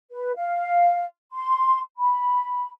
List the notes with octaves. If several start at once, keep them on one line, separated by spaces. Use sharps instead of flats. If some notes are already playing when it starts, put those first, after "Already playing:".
B4
F5
C6
B5